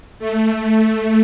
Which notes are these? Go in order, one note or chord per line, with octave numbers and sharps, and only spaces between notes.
A3